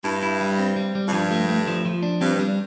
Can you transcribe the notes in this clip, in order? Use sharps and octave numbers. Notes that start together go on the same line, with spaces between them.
G2 E4
E4
G3
C4
G3
G3
F2
G2 F3
A3
A3
F3
F3
D4
G2 C4
G3